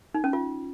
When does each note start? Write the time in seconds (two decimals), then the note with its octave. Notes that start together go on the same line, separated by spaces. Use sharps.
0.15 D#4
0.24 C#4
0.33 F4